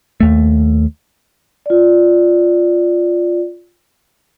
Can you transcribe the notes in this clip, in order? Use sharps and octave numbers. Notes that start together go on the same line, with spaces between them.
D#2 A3
F4 D5